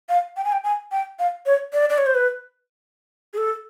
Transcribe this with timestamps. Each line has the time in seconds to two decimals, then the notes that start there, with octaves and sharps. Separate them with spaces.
0.09 F5
0.37 G5
0.44 G#5
0.52 G5
0.64 G#5
0.92 G5
1.19 F5
1.46 C#5
1.73 D5
1.90 D5
1.98 C#5
2.06 C5
2.15 B4
3.33 G#4
3.38 A4